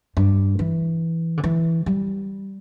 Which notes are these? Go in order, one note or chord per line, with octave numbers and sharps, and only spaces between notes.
G2
E3
D3
E3
G3